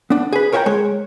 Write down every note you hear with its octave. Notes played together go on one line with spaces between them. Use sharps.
B3 D4
G#4 B4
A#4 C#5 E5 F#5 G5 A#5
G#3 C#5